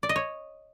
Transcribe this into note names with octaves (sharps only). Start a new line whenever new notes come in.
D5
D#5
C#5